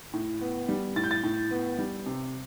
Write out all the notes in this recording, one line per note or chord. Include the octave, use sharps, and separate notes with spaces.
A2
B3
G3
A2 A6
G6
A6
A2
B3
G3
C3